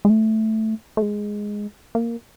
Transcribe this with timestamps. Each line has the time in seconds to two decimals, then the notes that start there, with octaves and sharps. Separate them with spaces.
0.05 G#3
0.10 A3
0.97 A3
1.02 G#3
1.95 A#3